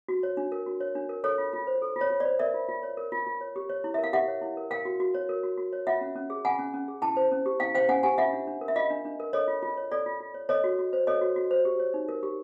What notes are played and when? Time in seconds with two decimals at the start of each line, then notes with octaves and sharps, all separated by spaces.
0.09 F#4
0.23 C#5
0.37 D4
0.52 A#4
0.66 F#4
0.80 C#5
0.95 D4
1.09 A#4
1.24 A4 C#5
1.38 F4
1.53 F4
1.67 C5
1.82 A4
1.96 F4
2.01 C#5
2.10 F4
2.20 C5 D5
2.39 A#4 D5 E5
2.54 F4
2.69 F4
2.83 C#5
2.97 A#4
3.12 F4
3.27 F4
3.41 C#5
3.56 G4
3.70 C#5
3.84 E4
3.94 A#4 E5
4.04 F5
4.13 G4 E5 F#5
4.28 C#5
4.42 E4
4.57 A#4
4.71 A#4 F5 G5
4.85 F#4
5.00 F#4
5.15 C#5
5.29 A#4
5.43 F#4
5.58 F#4
5.73 C#5
5.87 F4 E5 F#5
6.01 C#4
6.16 C#4
6.30 G#4
6.44 F4 F#5 G#5
6.59 C#4
6.74 C#4
6.88 G#4
7.02 E4 G5 A5
7.17 C5
7.32 C#4
7.46 G4
7.60 E4 F5 G5
7.75 C5 F5 G5
7.89 C#4 F#5 G#5
8.03 G4 F#5 G#5
8.18 F4 E5 F#5
8.33 D4
8.47 D4
8.61 A#4
8.68 E5
8.76 F4 D#5 F5
8.90 D4
9.05 D4
9.20 A#4
9.33 A4 C#5 D#5
9.48 F4
9.62 F4
9.77 C#5
9.92 A4 D5
10.06 F4
10.20 F4
10.34 C#5
10.49 A4 C#5 D#5
10.64 F#4
10.79 F#4
10.93 C5
11.07 A4 C#5 D#5
11.21 F#4
11.36 F#4
11.51 C5
11.65 G4
11.80 C#5
11.94 D#4
12.09 A#4
12.23 G4